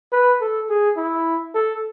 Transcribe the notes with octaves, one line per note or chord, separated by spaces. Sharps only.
B4
A4
G#4
E4
A4